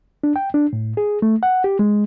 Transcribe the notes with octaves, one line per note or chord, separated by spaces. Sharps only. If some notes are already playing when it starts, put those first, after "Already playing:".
D4
G5
D4
A2
G#4
A3
F#5
G4
G#3